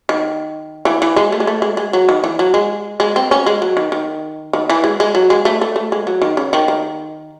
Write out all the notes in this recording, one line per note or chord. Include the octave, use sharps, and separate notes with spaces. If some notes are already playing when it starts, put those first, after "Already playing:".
D#3
E3
E3
G#3
A3
G#3
A3
G#3
G#3
F#3
D#3
E3
F#3
G#3
G#3
C4
C#4
G#3
F#3
D#3
D#3
D#3
E3
G#3
G#3
F#3
G#3
A3
A3
A3
G#3
F#3
D#3
C#3
D#3
D#3